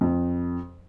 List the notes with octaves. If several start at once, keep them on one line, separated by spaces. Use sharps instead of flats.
F2